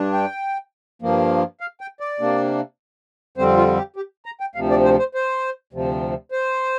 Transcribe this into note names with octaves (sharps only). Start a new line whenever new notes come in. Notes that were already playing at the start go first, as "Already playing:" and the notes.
Already playing: G2 D4
G5
G2 F3 A#3
F5
G5
D5
C3 A#3 D4
F2 D3 G3 C4 C5
F4
G4
G4
A#5
G5
D2 C3 F3 F5
D5
C5
C5
C5
D2 C3 F3
C5